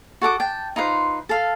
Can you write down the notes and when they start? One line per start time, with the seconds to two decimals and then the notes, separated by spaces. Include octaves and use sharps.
0.22 F#4 A4 F#5 D6
0.40 G5 A5
0.76 D#4 F4 B4 C5
1.29 A4 F5